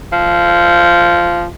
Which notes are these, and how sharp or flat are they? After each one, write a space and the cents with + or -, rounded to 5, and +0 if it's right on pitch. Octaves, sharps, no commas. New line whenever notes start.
F3 -10